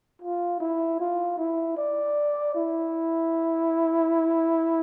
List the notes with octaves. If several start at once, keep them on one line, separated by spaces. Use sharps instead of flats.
F4
E4
F4
E4
D5
E4